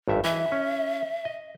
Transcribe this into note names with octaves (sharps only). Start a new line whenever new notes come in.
G#1 G2 E5
E3 D#5 E5
C#4
D#5